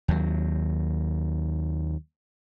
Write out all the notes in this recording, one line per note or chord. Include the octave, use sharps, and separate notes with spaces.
D#2 F#3